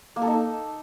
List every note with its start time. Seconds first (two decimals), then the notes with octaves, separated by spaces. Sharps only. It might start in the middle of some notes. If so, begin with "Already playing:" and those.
0.16 A#3
0.22 A4
0.27 D#4